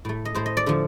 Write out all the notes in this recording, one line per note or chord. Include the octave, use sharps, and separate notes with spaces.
A2 A3
D#5
A2 A3 C5
D#5
D5
D3 F3 A3